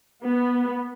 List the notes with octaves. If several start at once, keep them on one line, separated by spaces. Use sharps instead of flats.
B3